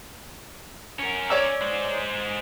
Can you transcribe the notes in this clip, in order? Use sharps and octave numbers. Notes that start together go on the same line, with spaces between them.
C#4 A#4
C#5 D5 E6
G#3 C5